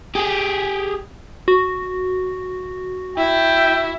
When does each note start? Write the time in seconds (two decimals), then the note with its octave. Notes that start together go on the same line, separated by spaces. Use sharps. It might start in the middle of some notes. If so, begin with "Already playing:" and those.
0.15 G4 G#4
1.48 F#4
3.18 E4 G5